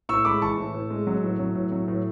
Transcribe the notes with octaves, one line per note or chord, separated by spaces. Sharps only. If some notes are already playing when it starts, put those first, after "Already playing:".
A2 C#6 E6
G#3 B5 D6
E3 A5 C#6
A2
A2
G#3
F#3
A2
F#3
A2
F#3
A2